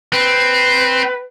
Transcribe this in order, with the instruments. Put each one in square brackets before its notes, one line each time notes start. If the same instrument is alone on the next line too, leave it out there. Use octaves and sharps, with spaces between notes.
[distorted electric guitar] C4 [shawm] B4